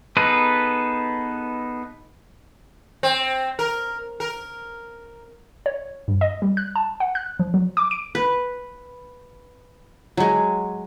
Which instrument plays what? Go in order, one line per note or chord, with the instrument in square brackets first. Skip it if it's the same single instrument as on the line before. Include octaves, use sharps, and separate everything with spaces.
[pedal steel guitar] B3 D#4 G#4 A4 B4
[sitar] C4
A#4
A#4
[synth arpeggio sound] C#5
G2
D#5
G3
F#6
A5
F#5
F#6
F3
F#3
D6
D7
[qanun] B4
F#3 G#3